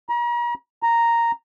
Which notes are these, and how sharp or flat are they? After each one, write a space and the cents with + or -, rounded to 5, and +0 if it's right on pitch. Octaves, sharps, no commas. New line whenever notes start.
A#5 +40
A#5 -5